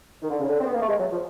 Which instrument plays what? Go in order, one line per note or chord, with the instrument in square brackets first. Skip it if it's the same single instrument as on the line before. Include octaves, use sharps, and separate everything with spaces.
[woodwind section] D#3
D3
C#3
D3
C4
B3
A#3
A3
G#3
F#3
F3